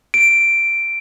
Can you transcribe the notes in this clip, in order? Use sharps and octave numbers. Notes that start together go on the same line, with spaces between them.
D7